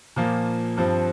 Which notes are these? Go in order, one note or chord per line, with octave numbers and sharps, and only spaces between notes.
A#2 F3 A#3
G2 F3 C4